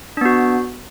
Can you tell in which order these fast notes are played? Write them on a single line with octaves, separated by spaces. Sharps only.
D4 B3 F#4